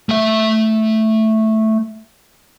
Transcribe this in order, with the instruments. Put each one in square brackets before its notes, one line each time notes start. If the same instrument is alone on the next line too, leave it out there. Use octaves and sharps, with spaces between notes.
[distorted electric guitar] A3 E5